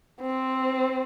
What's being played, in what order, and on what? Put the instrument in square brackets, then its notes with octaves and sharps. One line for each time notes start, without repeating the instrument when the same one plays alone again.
[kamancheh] C4